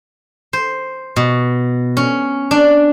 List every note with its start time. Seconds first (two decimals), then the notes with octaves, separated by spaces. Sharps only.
0.53 C5
1.16 B2
1.97 C#4
2.51 D4